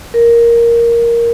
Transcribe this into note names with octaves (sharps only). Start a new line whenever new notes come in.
A#4